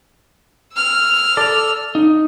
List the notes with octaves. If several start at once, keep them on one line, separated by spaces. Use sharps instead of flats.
E6 F6
A4 D5
D#4